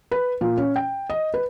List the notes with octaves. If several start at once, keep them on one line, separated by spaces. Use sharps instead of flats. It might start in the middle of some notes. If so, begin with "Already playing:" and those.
B4
A#2
C#4
G5
D#5
B4